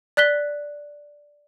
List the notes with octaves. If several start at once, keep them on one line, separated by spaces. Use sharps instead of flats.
D5 F#6 B6 G7